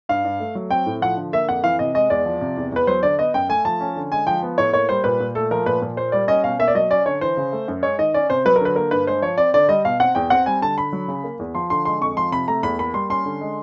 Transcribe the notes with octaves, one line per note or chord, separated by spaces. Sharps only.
G2 F5
G2
A3
F#3
C4 G5
A2
F3 F#5
D3
A#3 E5
F2 F#5
E3 F5
C3 D#5
G#3 D#5
E2 D5
F3
C3
E2
E2 B4
F#3 C5
D3 D5
B3 D#5
F#2 G5
A3 G#5
F3 A5
C#4
D3
G#3 G#5
F3 G5
B3
A2 C#5
A#3 C#5
G3 C5
A#2 B4
A#2
A3 A4
F3 A#4
A#2 B4
A#2
A#3 C5
G3 D5
C#4 D#5
B2 F5
A#3 E5
D5
F#3 D#5
C#4 D5
D3 C#5
E3 C5
C#3
A3
F#2
G#3 C#5
D#3 D#5
C#4 D5
C3 C5
F#3 B4
A#4
D3 B4
A#3 A#4
G2 B4
G#3 C5
F3 C#5
C4 D5
D3 D5
G3 D#5
B2 F5
C4 F#5
E2 G5
C4 F#5
G3 G#5
D3 A5
D3 B5
F#3
C#3
A#3
E2
F3 C6
D3 C6
G#3 C6
F2 C#6
F3 C6
C3 B5
A3 A#5
E2 B5
A#3 B5
G3 C6
C#4 C6
D3
G#3